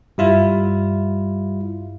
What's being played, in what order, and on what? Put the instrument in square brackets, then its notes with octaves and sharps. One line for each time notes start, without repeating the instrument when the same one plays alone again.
[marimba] G2 E5 [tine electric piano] G3 E4 F4